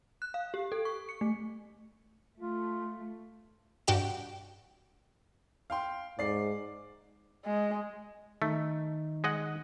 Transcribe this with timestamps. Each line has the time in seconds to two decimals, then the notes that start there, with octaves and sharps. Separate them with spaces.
0.22 F#6
0.34 F5
0.54 G4
0.72 A4
0.85 C#6
1.09 C#7
1.21 A3
2.40 A3 F4
3.87 G2 F#4 G4 G5 E7
5.70 F5 G5 C6
6.19 G#2 D5 C7
7.45 G#3
8.42 D#3 A3 D#4
9.24 G#3 D#5 F#5